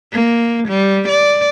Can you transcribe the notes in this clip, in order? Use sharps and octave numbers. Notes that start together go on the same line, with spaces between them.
A#3
G3
D5